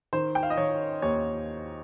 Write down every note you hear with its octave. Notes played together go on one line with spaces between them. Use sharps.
D#3 C5
G5
F5
D#5
D#3 C#5
D#2 C#5